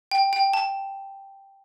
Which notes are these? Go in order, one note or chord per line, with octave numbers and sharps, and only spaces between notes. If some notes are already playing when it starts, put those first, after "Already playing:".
G5
G5
A5